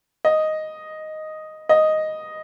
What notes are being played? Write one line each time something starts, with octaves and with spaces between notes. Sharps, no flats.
D#5
D#5